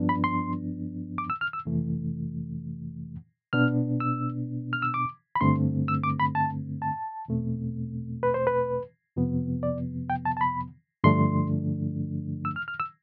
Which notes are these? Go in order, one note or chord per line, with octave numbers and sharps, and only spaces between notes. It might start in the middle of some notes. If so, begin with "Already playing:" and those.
Already playing: G2 F3 B3 D4
B5
C6
D6
E6
F6
E6
F2 C3 E3 A3
B2 B3 D4 F6
E6
F6
E6
D6
B5
G2 D3 A3 C4 C6
E6
D6
B5
A5
A5
E2 B2 A3 C4
B4
C5
B4
F2 C3 F3 B3
D5
G5
A5
A5
B5
G2 D3 F3 A3 D4 C6
E6
F6
F6
E6